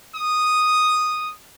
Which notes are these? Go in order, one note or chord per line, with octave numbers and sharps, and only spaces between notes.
D#6